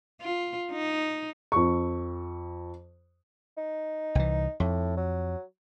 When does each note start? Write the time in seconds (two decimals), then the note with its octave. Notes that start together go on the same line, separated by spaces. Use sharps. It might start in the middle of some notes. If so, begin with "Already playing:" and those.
0.22 F4
0.72 D#4
1.52 F2 C#6
3.57 D#4
4.15 C2 E3
4.60 F2 A2
4.97 F#3